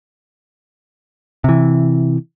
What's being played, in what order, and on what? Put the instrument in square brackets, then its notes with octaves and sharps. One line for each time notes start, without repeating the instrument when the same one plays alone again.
[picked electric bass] C3 E3